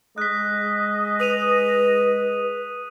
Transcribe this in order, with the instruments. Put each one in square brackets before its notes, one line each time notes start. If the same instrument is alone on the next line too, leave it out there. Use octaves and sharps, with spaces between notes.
[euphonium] G#3 [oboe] D#5 [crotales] F#6 B6
[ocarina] B4 [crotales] D#6 D#7 F7